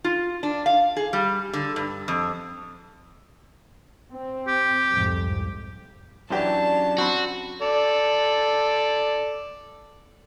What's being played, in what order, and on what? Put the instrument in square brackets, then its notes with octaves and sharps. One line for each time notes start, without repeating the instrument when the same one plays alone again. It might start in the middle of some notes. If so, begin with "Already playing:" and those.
[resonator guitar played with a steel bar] F4
D4
F5
G#4
G3
D3
G2
F2
[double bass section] C4
[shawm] G4
[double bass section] C2 F2 G#2
[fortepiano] F#2 E3 G4 [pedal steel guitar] F#3 D4 [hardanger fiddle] C#4 A5
[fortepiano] C4 B5 [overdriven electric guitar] F#4
[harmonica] A4 D5